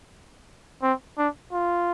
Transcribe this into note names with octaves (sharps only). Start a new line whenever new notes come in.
C4
D4
F4